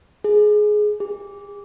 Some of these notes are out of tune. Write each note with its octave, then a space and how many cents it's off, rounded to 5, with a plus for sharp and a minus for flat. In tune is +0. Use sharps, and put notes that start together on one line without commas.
G#4 +15
G#4 -45